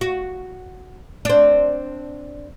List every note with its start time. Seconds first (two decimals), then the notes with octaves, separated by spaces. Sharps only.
0.01 F#4
1.25 C4 D4